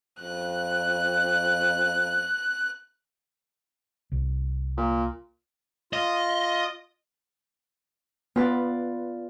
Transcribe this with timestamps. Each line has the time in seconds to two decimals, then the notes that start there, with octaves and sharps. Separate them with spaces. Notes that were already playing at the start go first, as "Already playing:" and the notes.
0.20 F2 F#6
4.12 C2
4.77 A#2
5.93 F4 D#5
8.36 B3 F4 B4 D5